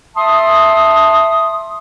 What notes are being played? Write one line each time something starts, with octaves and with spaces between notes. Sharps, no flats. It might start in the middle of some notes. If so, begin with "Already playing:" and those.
E5 A5 C6 D#6